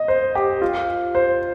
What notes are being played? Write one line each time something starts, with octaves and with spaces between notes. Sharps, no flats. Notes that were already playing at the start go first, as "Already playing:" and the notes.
Already playing: D#5
C5
G4
F4
C5